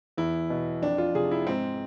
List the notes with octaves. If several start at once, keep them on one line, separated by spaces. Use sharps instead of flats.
E2 E4
B2
F2 D4
F4
C3 F3 G#4
E4
G#2 C4